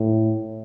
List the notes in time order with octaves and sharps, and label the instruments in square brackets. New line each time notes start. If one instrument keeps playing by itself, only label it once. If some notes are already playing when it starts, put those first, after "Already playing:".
Already playing: [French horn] A2